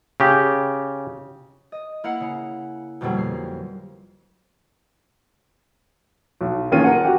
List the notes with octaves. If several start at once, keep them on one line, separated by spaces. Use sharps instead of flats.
C#3 G4
D#5
A#3 E4 F5 F#5 C#7
C#3
F2 B2 D3 F#3 G3 A#3
C7
B1
A1 D#3 A#3 C#4 F4 D#7
A#4 F#5
F#4 G4